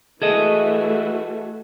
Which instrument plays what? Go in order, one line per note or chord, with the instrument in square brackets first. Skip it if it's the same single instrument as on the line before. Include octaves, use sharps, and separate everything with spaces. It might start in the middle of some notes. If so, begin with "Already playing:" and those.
[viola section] E3 A3 F#4 [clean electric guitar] G#4 A4 D#5